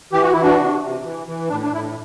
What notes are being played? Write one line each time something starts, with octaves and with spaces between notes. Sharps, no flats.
E3 G4
F#4
E3 E4
D4 F#4
C3
C3
E3
E3
A2 D4
D4
A2 E4